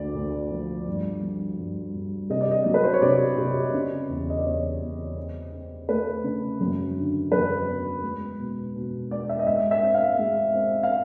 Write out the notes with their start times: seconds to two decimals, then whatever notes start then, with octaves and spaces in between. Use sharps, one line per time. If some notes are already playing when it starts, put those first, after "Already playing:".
Already playing: D2 D5
0.15 D2
0.51 F3
0.87 G2
1.22 F3
1.58 G2
1.94 G2
2.30 C3 D#5
2.41 D5
2.51 D#5
2.66 F#3
2.74 B4
2.83 C5
2.93 C#5
3.02 C3 D5
3.38 C3
3.74 C#3
4.09 E2
4.30 D#5
4.38 D5
4.45 E2 C#5
4.82 E2
5.17 C4
5.52 C4
5.89 A3 B4
6.24 C#3
6.61 F#2
6.97 D3
7.32 F#2 B4
7.68 B3
8.03 G#3
8.39 B2
8.76 B2
9.11 G#3 D5
9.29 E5
9.39 D#5
9.47 G#2 E5
9.71 E5
9.83 C4
9.94 F5
10.19 G#3
10.55 C4
10.83 F5